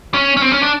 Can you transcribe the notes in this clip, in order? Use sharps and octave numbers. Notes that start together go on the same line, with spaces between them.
C#4
C#4
C4
C#4
D4